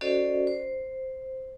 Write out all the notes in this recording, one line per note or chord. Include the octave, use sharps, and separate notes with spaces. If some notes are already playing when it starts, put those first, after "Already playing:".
C#4 F#4 A4 C5 D5 D#5
C5